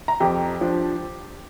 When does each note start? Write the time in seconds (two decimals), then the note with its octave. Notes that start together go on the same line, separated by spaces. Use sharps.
0.08 A#5
0.20 F2 G4 G5
0.61 F3 D4